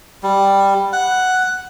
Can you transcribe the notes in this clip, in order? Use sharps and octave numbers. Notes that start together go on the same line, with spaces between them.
G3
F#5